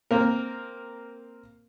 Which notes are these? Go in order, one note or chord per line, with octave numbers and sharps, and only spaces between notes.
A#3 C4 A#4